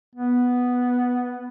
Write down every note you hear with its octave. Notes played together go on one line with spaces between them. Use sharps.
B3